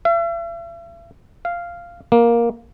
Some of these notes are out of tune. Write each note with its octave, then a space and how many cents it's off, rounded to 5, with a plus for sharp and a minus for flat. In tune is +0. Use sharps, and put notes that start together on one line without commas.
E5 +45
F5 -10
A#3 +10